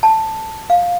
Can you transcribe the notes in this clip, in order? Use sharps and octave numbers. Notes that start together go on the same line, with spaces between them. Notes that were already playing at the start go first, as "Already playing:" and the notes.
A5
F5